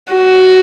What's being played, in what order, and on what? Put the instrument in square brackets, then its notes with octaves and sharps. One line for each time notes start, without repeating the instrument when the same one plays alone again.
[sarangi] F#4